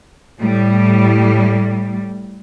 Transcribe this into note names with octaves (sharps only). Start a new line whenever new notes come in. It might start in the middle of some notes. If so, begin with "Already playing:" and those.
A2 G3